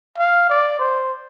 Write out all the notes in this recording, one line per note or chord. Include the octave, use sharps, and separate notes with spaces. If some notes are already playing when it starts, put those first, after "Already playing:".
F5
D5
C5